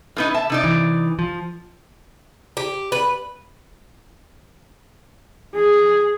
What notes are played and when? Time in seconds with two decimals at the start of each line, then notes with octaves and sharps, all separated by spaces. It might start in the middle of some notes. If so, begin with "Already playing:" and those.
0.17 A2 B3 D#4
0.34 E5 A5
0.50 C3 D#4 D5
0.64 E3
1.19 F3
2.57 G4
2.92 B4
5.55 G#4